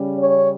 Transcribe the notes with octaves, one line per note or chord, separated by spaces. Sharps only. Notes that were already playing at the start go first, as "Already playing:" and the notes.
Already playing: C#3 G3 C#4
C#5